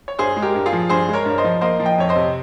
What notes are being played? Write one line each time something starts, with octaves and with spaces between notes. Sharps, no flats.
C#5
G2 G#4 C5
G#3
G4 A#4
G2
F4 G#4
F3
G2 G#4 C5
G#3
A#4 C#5
G2
C5 D#5
F3
A#3 C5 D#5
F3
D#5 G5
F2 C#5
C5 D#5
C3